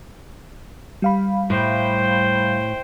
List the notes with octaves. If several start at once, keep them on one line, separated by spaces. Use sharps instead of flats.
G3 F5 B5
A2 C5 G5